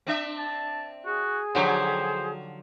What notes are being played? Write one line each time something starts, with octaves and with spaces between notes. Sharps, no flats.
C4 D4 E5
A5
F#4 G#4
D3 F3 F#3 D#4 F#4 G4 C5